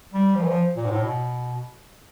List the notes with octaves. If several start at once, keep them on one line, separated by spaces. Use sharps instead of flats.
G3
F3
E3
F3
A#2
G#2
A2
B2